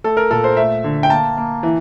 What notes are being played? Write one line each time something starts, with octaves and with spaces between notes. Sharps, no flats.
A3 A4
A#4
A#2 A4
C5
A3 E5
D3
G5
A#3 A5
A#3
E3